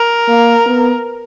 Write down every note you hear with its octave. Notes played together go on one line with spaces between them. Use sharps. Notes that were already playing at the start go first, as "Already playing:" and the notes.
Already playing: A#4
A#3
B3